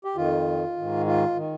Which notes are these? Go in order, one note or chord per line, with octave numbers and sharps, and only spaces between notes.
G4
F2 D#3 F4
G#2 D#3
F4
D#3